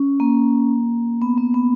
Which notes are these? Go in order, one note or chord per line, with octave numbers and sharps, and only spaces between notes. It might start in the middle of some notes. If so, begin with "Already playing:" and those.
Already playing: C#4
A#3
B3
B3
B3